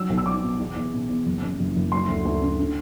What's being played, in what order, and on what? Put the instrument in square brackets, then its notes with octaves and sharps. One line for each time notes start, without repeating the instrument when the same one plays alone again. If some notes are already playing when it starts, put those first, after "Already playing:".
Already playing: [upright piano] F#3 E6
B1
E6
F#3 D6
B2
E2
E2
B2
E2
F#1
F#2
F#1
F#1
F#3 C6
D2
D2
D3
D3